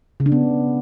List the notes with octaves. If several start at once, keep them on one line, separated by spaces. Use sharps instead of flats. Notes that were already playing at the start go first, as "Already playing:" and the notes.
C#3
D4
B3